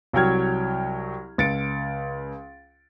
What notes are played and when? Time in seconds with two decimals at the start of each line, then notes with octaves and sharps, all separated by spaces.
0.13 C2 F#3 F#4 G5 F6 G#6
1.38 C#2 A6 C#7 D7